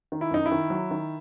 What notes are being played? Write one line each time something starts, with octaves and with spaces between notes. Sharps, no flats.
D#3
E4
F#2 D#4
E4
D#3
F#3
D#3